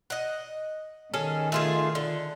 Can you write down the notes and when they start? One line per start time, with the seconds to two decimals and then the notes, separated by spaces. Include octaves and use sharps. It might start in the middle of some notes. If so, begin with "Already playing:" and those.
0.10 D#5 F#5
1.14 D#3 C#4 G#4 A4
1.52 A3 F4 G#4
1.95 D3